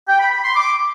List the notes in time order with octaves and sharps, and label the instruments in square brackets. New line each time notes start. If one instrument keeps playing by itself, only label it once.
[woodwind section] G5
B5
B5
C6
D6